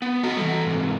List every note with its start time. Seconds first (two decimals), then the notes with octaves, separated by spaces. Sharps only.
0.02 B3
0.23 F#4 A4 D#5 A#5
0.36 E3 G3
0.66 G#2 C3